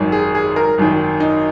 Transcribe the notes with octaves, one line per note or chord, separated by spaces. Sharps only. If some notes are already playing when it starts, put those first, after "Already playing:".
Already playing: G#1 F#2 D#3
G#4
G#4
A#4
G#1 F#2 D#3
D#4